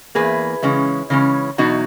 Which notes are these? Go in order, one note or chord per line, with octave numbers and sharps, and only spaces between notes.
E2 B2 A#3 G#4 B4
C#3 E3 G#3 C#4
C#3 E3 G#3 C#4
E2 B2 F#3 D#4 F#4